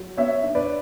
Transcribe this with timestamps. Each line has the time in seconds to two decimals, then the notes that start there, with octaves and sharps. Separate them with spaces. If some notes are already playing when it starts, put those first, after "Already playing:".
Already playing: F#3
0.17 B3 C#5 E5
0.43 D4
0.55 B4 D5